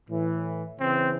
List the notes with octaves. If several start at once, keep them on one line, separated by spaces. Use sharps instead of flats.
A2 E3
C#3 E3 C4